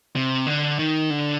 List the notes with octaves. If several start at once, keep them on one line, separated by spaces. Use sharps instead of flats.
C3
D3
D#3
D3